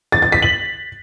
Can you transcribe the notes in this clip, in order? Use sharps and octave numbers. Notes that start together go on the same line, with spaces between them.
A6
A6
B6
F#7